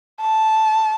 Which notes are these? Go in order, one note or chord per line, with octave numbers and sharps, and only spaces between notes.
A5